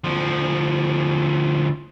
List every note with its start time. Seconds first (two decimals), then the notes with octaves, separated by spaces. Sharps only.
0.04 D2 F3